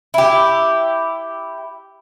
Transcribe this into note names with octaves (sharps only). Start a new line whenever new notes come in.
E4 G4